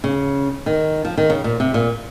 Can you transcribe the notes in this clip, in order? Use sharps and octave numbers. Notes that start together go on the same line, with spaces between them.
C#3
D#3
F3
D#3
C#3
A#2
C3
A#2